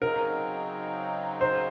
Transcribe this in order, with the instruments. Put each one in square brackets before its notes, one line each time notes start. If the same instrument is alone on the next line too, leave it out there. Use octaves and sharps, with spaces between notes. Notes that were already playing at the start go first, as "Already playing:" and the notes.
[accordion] C#3 F#3 C4 D#4 [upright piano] A#4
[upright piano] C5